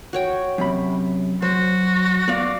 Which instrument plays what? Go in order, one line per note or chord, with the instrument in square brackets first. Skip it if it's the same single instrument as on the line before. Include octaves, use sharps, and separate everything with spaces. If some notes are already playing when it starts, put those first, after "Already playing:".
[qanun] F#4 C#5 G5
[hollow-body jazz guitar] F#2 C3 B5
[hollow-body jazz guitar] F#3 [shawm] F#4 [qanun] C5
[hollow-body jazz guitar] B3 [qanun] D5 F5